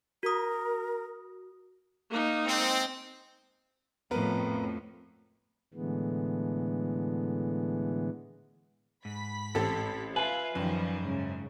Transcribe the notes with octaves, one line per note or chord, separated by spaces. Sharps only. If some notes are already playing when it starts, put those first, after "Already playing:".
F#4 A#4 D#6
A#3 D#4
G#3 C4
F2 A2 B3 A#4 B4
A2 D3 E3 G#3 B3
G#2 B5 B6
A1 C4 G4 A4
F4 B4 E5 F5 G#5
F#2 D#3 F3 G3
G#2 C#3